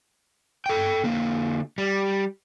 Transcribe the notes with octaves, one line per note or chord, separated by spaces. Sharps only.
A4 G5
D3 A#3
G3